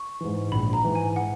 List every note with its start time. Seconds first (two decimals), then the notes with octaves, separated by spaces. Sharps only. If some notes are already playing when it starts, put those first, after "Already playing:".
Already playing: C#6
0.21 G#2 E3
0.52 A#1 B5
0.73 A#5
0.84 G#2 E3
0.95 G#5
1.16 F#5